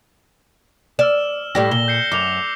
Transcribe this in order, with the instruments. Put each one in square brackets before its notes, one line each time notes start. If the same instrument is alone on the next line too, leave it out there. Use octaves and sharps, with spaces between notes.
[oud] D5 [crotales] E6 F6 E7
[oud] A2 G3 G4 [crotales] A#6
[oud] A#2 [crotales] G7
[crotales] G6 C7 C#7
[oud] F#2 [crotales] D6 F7